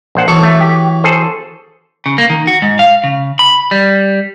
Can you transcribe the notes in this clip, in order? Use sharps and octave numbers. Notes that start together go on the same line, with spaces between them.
A#1 C5 F#5
E3 F#3 B3 A4
A3
G4
G#4 A4 C5
C#3
A#3
D#3
F#4
G#2
F5
C#3
B5
G3